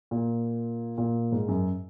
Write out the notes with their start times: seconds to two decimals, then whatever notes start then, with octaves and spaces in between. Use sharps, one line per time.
0.11 A#2
0.98 A#2
1.32 G#2
1.48 F#2